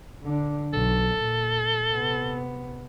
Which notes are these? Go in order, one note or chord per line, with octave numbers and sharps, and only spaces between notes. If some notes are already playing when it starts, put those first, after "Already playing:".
D3 D4
B1 A4
A#2
C3 B3